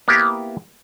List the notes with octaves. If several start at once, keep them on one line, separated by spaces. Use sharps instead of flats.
A#3 B3 E4 G4